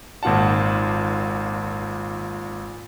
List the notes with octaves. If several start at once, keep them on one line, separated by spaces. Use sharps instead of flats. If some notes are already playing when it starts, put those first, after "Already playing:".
G#1 A#2 F4 F#5 A5